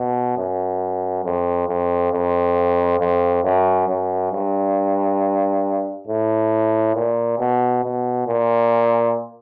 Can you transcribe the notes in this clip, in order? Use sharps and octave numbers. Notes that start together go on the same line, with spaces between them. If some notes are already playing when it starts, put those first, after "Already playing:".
Already playing: B2
F#2
F2
F2
F2
F2
F#2
F#2
G2
A2
A#2
B2
B2
A#2